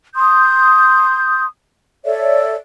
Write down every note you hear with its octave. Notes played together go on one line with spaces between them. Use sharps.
C6 D#6 G6
A4 C#5 D5 E5